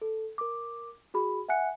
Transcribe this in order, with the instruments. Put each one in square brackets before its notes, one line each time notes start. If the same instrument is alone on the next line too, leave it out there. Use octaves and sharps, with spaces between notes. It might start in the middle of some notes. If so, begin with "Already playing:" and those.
[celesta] A4
A#4 D6
F#4 G#4 B5
E5 F#5 G#5 F#6 C#7